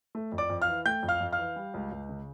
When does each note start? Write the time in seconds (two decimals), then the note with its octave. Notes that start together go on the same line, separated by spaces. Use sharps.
0.15 A3
0.32 F2
0.38 D5 D6
0.50 F2
0.62 F5 F6
0.68 E3
0.86 A3 G5 G6
1.03 F2
1.08 F5 F6
1.21 F2
1.33 F5 F6
1.38 E3
1.56 G3
1.74 C#2
1.91 C#2
2.09 C#3